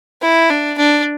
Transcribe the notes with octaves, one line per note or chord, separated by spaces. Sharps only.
E4
D4
D4